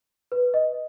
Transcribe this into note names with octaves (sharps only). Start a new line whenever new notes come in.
B4
D#5